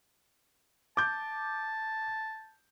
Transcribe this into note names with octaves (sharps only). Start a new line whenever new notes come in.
A5 D6 G6